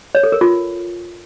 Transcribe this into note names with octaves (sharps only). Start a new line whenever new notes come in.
C#5
A4
A#4
F4